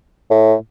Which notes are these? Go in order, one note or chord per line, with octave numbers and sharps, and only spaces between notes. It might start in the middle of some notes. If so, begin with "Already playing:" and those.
A2